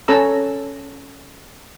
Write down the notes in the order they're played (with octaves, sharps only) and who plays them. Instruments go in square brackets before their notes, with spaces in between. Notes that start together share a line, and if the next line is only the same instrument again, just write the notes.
[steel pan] C#4 A4 A#5 E6